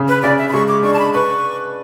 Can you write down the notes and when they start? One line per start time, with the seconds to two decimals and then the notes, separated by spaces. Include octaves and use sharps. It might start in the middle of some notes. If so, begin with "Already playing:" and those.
Already playing: C#3
0.08 B4
0.22 C#3 D5
0.38 E5
0.49 B5
0.53 G#3 C#6
0.68 D6
0.83 D4 C#6
0.94 A5
0.99 B5
1.14 B4 C#6